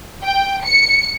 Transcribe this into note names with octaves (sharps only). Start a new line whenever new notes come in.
G5
C#7